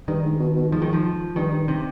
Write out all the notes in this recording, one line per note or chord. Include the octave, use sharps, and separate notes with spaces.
G2 D#3
G#2
B2
B2
G#2 F3
D#3
F3
G2 D#3
G2
C3